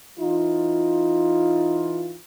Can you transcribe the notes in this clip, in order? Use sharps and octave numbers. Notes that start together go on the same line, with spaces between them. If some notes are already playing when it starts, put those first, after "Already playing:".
E3 D#4 F4